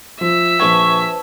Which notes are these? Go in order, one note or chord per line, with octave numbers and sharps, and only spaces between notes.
F3 E5
A#1 B4 C5 A5 C#6 G#6